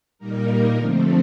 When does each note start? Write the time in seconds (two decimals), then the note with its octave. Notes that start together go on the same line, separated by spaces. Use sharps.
0.18 A#2 G3 A#3 D#4 A#4
0.77 D3 F3 A3 C4